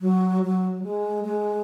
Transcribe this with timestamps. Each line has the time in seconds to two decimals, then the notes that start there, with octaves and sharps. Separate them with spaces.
0.01 F#3
0.43 F#3
0.83 G#3
1.25 G#3